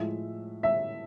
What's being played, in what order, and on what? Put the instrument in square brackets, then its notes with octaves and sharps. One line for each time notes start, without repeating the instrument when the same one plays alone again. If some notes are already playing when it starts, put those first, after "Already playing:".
Already playing: [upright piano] A2 F3 G#3 E5
E5